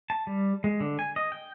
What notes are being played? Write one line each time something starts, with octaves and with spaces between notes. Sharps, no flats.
A5
G3
G#3
D3
G#5
D#5
G5